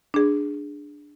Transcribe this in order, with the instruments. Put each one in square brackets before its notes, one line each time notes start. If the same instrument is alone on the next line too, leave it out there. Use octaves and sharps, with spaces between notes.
[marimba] D4 G#4